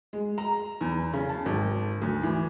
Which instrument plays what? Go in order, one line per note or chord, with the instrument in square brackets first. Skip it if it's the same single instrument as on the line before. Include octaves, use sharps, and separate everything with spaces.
[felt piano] G#3
A#5
E2
C#3
A5
G#1
D2
E3